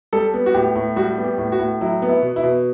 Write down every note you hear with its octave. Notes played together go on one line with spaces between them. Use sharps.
G3 A4
B3
F#4
A2 G4
A2
G3 F#4
B3
G4
A2
F#4
A2
F#3 E4
B3
E4
B2
E4
B2